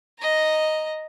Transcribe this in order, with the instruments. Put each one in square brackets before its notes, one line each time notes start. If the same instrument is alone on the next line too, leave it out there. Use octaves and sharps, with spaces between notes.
[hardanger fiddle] D#5 A#5